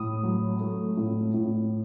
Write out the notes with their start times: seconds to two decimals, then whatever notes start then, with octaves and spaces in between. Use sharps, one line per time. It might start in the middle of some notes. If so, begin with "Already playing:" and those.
Already playing: A2 D#6
0.23 F#3
0.60 A3
0.97 A2
1.34 A2